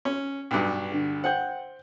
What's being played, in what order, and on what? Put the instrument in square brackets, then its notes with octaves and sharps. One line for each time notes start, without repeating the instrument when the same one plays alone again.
[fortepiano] C#4
B1 G2
[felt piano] D3
[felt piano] C5 G5 G6 [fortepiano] F#5